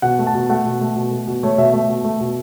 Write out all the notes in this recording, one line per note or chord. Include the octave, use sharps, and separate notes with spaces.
B2 F#5
A3
A5
B2
A3 F#5
B2
A3
B2
A3
B2
A3 C#5
B2 E5
A3 E5
B2
A3
B2